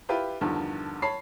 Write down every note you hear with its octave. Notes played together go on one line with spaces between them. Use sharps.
E4 F4 G4 B4
E2 G2 D3 D#3 F3
C#5 A5 B5 C7